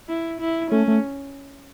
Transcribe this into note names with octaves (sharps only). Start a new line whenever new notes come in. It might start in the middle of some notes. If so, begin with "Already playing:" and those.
E4
E4
A3 C#4
A3